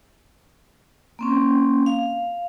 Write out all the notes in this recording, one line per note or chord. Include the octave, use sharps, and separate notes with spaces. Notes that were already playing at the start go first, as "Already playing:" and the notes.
A#3 C4 C#4
F5